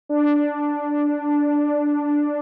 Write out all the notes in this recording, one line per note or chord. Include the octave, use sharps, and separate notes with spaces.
D4